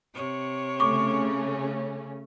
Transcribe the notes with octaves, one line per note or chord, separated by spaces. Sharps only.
C3 C#5
C#3 A3 C#4 C#6 D6